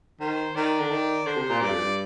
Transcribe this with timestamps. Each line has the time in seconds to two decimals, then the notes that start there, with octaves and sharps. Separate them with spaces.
0.20 D#3 C5
0.55 D#3 D5
0.80 D3
0.91 D#3
1.26 D3 C5
1.37 C3
1.49 A#2
1.61 G2 D5
1.70 F2
1.80 G2